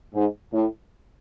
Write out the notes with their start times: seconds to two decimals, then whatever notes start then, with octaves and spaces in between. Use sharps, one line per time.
0.13 G#2
0.53 A2